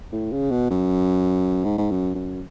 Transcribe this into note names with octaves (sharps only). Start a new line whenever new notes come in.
A2
C#3
B2
F#2
G#2
G#2
F#2
F#2